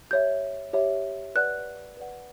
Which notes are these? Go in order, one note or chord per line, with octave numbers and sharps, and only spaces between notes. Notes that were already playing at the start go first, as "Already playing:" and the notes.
G4 C#5 E5 G6
G4 C#5 E5
B4 D5 F#5 F#6
B4 D5 F#5